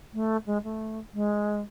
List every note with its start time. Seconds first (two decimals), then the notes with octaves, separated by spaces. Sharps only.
0.14 A3
0.46 G#3
0.64 A3
1.14 G#3